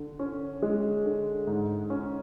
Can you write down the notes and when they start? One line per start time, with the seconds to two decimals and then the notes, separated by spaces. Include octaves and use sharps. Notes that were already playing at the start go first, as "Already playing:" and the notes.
Already playing: D3
0.19 C#4
0.62 G#3
1.06 D3
1.47 G#2
1.90 C#4